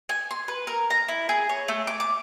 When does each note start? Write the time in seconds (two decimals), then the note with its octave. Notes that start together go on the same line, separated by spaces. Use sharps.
0.09 G#5
0.31 C6
0.48 B4
0.67 A#4
0.90 A#5
1.08 E4
1.29 G#4
1.49 C#5
1.68 A3
1.87 D6
2.00 D6